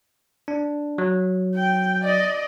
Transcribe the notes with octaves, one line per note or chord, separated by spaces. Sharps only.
D4
F#3
G5
D5 D#5